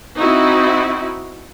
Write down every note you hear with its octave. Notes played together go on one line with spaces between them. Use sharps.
C4 D#4 E4 F#4